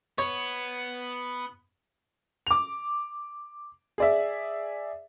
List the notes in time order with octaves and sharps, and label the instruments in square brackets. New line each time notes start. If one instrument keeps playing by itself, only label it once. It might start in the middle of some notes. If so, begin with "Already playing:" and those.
[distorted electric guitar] B3 [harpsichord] C#5
[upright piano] D6 F7
G#4 D5 E5